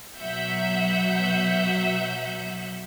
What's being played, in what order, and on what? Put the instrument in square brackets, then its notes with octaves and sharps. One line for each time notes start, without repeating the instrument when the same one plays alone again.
[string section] B2 F#3 E5 F#5 G6